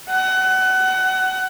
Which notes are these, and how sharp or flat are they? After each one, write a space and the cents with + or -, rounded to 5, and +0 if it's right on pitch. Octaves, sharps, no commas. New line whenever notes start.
F#5 +25